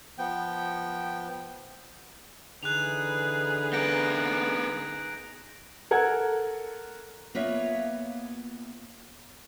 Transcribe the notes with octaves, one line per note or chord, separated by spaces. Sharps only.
F3 B3 G5
D3 E3 D#4 G#4 B4 F#6 F7
B3 A#4 G6 A#6 D7
A4 A#4 F#5 G#6
A#3 B3 F4 C#5 E5